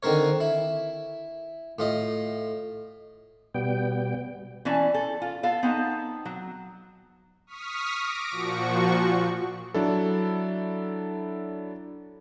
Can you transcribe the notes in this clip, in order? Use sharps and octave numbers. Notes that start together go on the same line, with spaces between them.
D3 D#3 C4 A#4 C#5
E4
A2 F4 D#5
B2 G3 B3 G5
E3 C#4 F#4 D5 A5
A4
F4
B3 A4 F5
B3 C4 D#4 A5
F#3
C#6 D#6 F6 B6
D6 A#6 D7
A#2 F3 F#4 C#6
F#3 D4 E4 A4